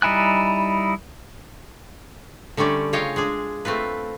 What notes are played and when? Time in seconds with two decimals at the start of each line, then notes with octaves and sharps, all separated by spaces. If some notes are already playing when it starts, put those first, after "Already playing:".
0.02 G3 D#4 E4 G#5 F#6
2.57 D3 G3 A3 C#4 D5
2.93 C#3 F4 C#5 D#5 F5 G5
3.16 G#3 D4 G#4
3.65 A3 C4 F4 B4